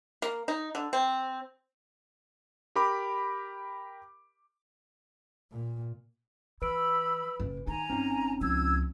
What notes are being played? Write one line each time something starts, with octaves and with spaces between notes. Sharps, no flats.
A#3
D#4
D3
C4
G4 A#4 B5 D6
A#2
E3 B4 B5 E6 D7
F#1
D#3 D#4 G#5 A#5
G1 C4 C#4 D#4
C#2 F3 E6 G#6